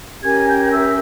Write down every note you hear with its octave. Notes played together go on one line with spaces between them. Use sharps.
C#4 G4 A#4 G#5 G#6
G5 G6
G6
E5 E6